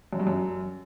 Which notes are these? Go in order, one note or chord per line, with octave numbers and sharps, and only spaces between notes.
F#2
G2
F#2